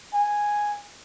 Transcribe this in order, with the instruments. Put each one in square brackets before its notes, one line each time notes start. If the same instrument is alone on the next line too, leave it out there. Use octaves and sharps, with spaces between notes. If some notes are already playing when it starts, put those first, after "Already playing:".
[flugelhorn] G#5